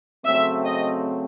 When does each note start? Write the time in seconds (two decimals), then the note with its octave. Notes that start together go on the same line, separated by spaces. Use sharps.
0.25 C#3 F#3 A3 C4 E5
0.65 D#5